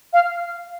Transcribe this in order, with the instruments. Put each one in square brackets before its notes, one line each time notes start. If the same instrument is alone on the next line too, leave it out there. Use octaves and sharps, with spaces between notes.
[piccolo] F5